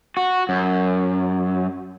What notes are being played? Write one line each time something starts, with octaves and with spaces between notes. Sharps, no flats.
F#4
F#2